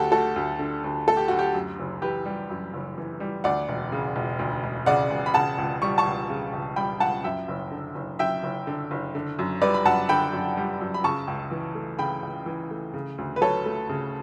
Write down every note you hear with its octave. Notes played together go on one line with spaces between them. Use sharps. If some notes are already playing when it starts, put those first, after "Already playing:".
Already playing: D2 D3 F#4 G4 A4
A3 F#4 A4
D2
D3
D2
A3 A4
G4
D2 F#4
G4
F#2
F#1
E3 G4 B4
G3
F#2
F#1
E3
G3
D2 D5 F#5
E1
C#3
E1
D2
E1
C#3 D5 F#5
E1
B5
C#3 F#5 A5
C#2
G3 C#6
A5 C#6
C#2
C#3
C#2
G3 G5 B5
C#2 F#5 A5
F#2 E5 G5
F#1
D3
F#1
F#2 E5 G5
F#1
D3
F#1
D3
F#2
G3 B4 D5
B5
F#2 F#5 A5
D3 G5 B5
F#2
G3
F#2
B5
C#3 A5 C#6
C#2
E3
A3
C#3 G5 B5
C#2
E3
A3
C#3
D2
B4
F#3 A4 C#5
A3
C#3